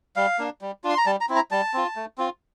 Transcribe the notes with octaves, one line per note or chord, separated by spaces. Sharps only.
G3 F5
A#3 D4
G3
D4 F4
C6
A#5
G3 A5
A#5
C4 E4
A#5
G3 A5
C4 F4
A3
C4 F4